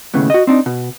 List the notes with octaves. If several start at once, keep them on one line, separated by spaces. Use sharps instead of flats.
D#2 A2 C#3 B3
F#4 D#5
C4 D4 D#4
B2